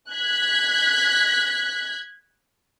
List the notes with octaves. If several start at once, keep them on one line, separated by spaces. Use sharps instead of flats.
F#6 G#6 B6